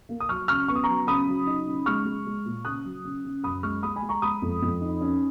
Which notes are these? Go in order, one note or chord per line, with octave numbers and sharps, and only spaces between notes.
A#3
D#6
F#3 C#6 F6
C#3 C#6 F6
B3 C#6
D#6
F#3 A#5 C#6
C#3 B5 D#6
F#3
D#4
C#3
G#3 C#6 F6
G#3
G#3
A#2
C#3 D#6 F#6
F#3
C#3
C#3
F#2 B5 D#6
G#3 C#6 F6
G#3 B5 D#6
G#5 B5
G#3
A#5 C#6
G#3 B5 D#6
F2
F2
D#4
C#4